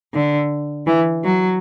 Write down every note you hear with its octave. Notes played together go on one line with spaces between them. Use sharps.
D3
E3
F#3